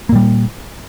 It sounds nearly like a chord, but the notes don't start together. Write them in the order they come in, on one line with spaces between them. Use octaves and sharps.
A#3 A#2 G3